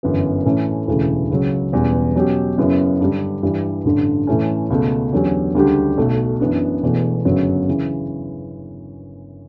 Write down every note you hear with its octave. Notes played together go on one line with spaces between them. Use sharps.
G1 F#2 E3 B3
A2 E3 A3 C#4
E1 D2 C#3 E3 A3
C#2 C#3 F#3
E1 E2 C#3 G3 B3
B2 F#3 C#4 G4
F#2 C#3 F#3 B3 E4
G2 D3 G3
G2 E3 G3
A1 G2 D3
A2 E3 A3 C#4
C#2 B2 A3
E2 D3 F#3 C#4 G4
D2 C#3 G3 D4 G4
B1 B2 A3
F#2 E3 B3 D4
E1 E2 B2 A3 E4
G1 F#2 C#3 F#3 B3
C#3 E3